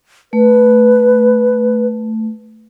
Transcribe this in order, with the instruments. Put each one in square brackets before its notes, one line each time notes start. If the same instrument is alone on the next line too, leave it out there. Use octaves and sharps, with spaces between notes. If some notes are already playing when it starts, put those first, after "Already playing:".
[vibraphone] A3 [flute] B4